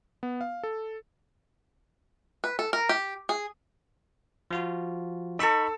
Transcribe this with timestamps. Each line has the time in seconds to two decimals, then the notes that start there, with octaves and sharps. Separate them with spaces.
0.23 B3
0.41 F5
0.63 A4
2.44 B4
2.59 A4
2.73 A#4
2.89 G4
3.29 G#4
4.51 F3 F4 F#4
5.39 D#4 A4 B5 C#6 E6